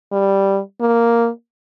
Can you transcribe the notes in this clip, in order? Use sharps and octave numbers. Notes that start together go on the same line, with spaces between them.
G3
A#3